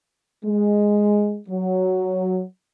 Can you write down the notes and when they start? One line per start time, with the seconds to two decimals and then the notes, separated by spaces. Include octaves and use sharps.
0.44 G#3
1.49 F#3